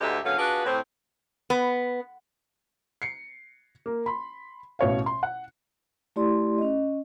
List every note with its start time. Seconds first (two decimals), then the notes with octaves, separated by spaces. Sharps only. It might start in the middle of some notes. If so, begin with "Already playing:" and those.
0.01 D2 G#2 D3 G4 D#5 E5
0.24 F#2 D3 F#3 B3 C#4 F5
0.38 D4 F4 F#4 G#4 B4
0.65 A2 C4
1.50 B3
3.02 C7 C#7
3.86 A#3
4.06 B5 C6
4.79 A1 B2 C#5 F5
5.06 C6
5.23 F#5
6.16 A3 E4 G4 D5 C6
6.58 C#4 D#5